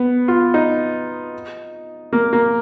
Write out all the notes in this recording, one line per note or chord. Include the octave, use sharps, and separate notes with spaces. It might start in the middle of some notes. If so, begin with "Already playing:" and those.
Already playing: B3
F4
D#4
A#3
A#3